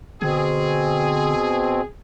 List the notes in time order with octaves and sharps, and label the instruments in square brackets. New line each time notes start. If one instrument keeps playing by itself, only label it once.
[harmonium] B2 C4 [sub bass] D3 [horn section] G#4